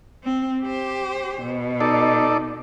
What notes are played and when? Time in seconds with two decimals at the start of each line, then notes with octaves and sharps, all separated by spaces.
0.23 C4
0.63 G4 C5
1.41 B2
1.81 D#4 A4 D5